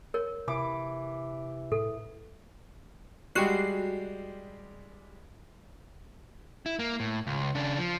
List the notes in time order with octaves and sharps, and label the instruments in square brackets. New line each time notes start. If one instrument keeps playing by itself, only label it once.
[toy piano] A#4 C#5
[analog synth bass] C3 [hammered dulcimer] E3 D6
[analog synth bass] A2 [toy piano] A4
[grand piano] G3 G#3 G4 [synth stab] F#4 C7
[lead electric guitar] E4
A#3
A2
C#2
C#3 D4
F3